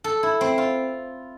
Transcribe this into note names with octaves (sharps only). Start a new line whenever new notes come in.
A4
E4
C4
F4